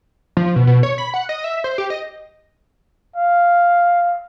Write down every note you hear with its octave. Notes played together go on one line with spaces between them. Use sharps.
F3
B2
B2
C#5
B5
F#5
D#5
E5
C5
G4
D#5
F5